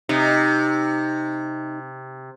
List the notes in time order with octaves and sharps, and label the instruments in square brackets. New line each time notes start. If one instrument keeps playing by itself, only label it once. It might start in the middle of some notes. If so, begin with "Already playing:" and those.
[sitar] C3 [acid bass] D#4